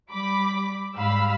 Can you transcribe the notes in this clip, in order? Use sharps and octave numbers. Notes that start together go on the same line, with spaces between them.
G3 B5 D6
G#2 G3 F5 B5 E6